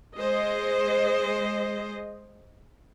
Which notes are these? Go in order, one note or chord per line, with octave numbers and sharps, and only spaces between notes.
G#3 C5 D#5